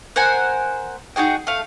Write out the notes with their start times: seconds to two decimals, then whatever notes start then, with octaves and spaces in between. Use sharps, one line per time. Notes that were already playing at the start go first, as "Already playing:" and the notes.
0.16 A#4 C5 F#5 G#5
1.16 D#4 F#4 G#4 G5
1.47 A3 F5